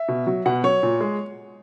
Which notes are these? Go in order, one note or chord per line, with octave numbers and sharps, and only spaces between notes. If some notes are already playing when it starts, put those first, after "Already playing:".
Already playing: E5
B2
F#3
B2 F#5
F#3 C#5
A#2
G#3